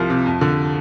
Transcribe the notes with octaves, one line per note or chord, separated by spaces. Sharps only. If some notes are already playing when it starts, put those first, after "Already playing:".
Already playing: C2 F3
C3
F2
D3